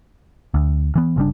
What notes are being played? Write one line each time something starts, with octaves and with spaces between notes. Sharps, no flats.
D2
E3 B3
G1 C#3 G3 D4